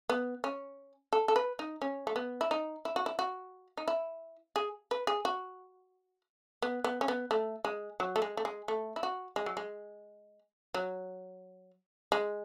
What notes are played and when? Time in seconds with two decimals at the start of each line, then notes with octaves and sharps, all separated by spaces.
0.10 B3
0.44 C#4
1.13 A4
1.28 A4
1.36 B4
1.59 D#4
1.82 C#4
2.07 A3
2.16 B3
2.41 E4
2.51 D#4
2.85 E4
2.96 F#4
3.06 E4
3.19 F#4
3.77 D#4
3.88 E4
4.56 G#4
4.91 B4
5.07 G#4
5.25 F#4
6.62 B3
6.84 B3
7.01 C#4
7.08 B3
7.31 A3
7.65 G#3
8.00 F#3
8.16 A3
8.22 G#3
8.37 A3
8.45 G#3
8.68 A3
8.96 E4
9.03 F#4
9.36 G#3
9.46 F#3
9.57 G#3
10.74 F#3
12.12 G#3